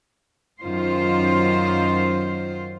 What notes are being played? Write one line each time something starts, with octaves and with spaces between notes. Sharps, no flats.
F#2 D#3 F#3 F4 C5